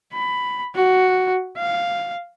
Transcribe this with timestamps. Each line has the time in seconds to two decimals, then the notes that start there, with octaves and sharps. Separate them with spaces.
0.13 B5
0.75 F#4
1.58 F5